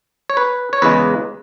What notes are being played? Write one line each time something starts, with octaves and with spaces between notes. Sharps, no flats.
C#5
B4
C#5
E2 C#3 G#3 B4